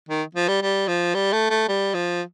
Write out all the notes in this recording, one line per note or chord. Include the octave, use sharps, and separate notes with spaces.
D#3
F3
G3
G3
F3
G3
A3
A3
G3
F3